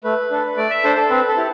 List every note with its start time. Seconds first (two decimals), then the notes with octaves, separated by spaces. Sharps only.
0.04 A3 B4
0.31 D4 A4
0.57 A3 D5
0.71 E5
0.84 D4 A4 C5
0.97 A4
1.10 C4 B4
1.28 A4
1.37 E4 G4